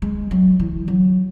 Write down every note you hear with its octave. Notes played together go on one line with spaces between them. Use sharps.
G#3
F#3
E3
F#3